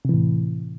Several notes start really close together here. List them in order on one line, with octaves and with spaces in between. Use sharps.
C3 E3 A2